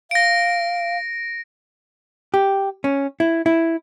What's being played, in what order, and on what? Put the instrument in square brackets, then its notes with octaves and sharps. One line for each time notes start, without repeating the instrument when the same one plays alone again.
[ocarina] F5 [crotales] A#6 D7
[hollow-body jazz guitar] G4
C#4
E4
E4